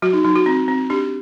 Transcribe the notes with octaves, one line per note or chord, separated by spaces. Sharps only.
F#3 F#4
D#4
F#3 D#4
F#4
C4
C4
D4 G4